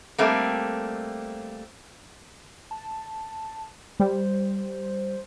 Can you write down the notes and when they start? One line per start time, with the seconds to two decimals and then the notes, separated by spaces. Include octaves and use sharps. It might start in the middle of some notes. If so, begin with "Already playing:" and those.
0.18 G3 A3 A#3 C4
2.71 A5
4.00 G3 C5